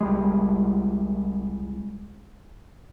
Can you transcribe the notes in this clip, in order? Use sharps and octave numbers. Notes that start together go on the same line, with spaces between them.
C2 G3 G#3